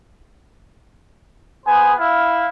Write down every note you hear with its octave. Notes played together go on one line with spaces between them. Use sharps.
B3 G#4 C5 G#5
E4 F5